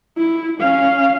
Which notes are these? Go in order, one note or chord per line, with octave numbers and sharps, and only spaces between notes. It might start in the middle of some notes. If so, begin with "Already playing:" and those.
E4
C#4 F5